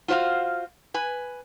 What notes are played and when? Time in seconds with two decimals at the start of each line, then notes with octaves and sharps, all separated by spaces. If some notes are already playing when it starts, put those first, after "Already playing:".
0.08 F4 F#4 C5 D5 F5
0.94 B4 G#5